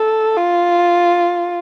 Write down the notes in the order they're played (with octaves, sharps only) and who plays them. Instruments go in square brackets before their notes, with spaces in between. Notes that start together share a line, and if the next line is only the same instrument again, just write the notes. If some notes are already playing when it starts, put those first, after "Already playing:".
Already playing: [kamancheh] A4
F4